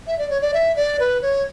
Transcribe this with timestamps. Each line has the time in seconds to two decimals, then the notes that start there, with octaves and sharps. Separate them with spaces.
0.07 E5
0.18 D5
0.30 C#5
0.41 D5
0.54 E5
0.76 D5
1.00 B4
1.22 C#5